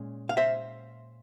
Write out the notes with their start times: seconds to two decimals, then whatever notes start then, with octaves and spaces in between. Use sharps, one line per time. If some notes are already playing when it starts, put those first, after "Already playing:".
Already playing: A#2 G#3 C#4
0.29 F5
0.37 C5 E5